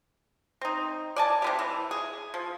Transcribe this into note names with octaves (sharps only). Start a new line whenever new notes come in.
C4 D#4
D5 G#5 A5
C3 B3 G4
E3
G#4
F3